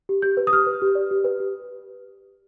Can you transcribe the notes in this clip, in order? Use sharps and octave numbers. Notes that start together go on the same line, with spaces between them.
G4
G4 G6
B4
D#6
G4 F6
B4
G4
D5
G4
B4
G4